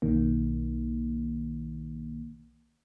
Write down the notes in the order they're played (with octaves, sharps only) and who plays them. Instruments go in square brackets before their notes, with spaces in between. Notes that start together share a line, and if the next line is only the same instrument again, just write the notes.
[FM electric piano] B1 D#3 A#3